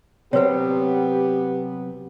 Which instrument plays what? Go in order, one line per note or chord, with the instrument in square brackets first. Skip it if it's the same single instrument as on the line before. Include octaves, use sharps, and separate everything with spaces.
[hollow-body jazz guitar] C3 F#3 C4 [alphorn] B3 [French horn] G4 [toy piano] B4 C#5